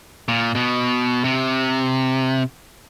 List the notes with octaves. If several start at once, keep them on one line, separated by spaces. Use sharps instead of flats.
A#2
B2
C3